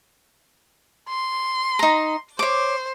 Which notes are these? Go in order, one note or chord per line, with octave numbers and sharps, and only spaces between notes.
C6
D#4 A#5
C5 C#5 D6